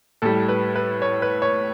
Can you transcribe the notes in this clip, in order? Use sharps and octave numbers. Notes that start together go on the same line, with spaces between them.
A2 G3 A4
B4
B4
C#5
B4
C#5